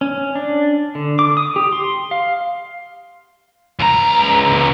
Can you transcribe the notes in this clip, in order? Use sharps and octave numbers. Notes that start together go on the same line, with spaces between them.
C#4
D4
D3
D6
D#6
G4
C6
F5
C#2 A#5